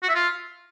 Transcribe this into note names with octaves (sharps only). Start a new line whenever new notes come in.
F#4
E5
F4